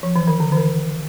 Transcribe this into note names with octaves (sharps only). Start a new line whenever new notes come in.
F3
E3
D#3
D3
E3
D#3